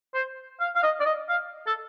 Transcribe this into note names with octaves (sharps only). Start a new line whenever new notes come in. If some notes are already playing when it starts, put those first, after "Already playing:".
C5
F5
F5
D#5
D5
D#5
F5
A4